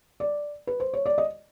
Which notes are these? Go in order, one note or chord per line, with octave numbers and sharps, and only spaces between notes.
D5
B4
C5
C#5
D5
D#5